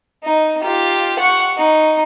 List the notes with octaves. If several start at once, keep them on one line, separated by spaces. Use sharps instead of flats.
D#4
F4 G4
F#5 C#6
D#4